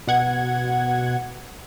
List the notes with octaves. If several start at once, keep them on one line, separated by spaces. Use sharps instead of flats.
B2 F#5 G#6